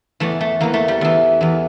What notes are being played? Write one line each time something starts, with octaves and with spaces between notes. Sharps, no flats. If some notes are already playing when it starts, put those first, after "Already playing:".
E2 E3 A3
A3
E2 E3 A#3
A3
G3
E2 E3
E2 E3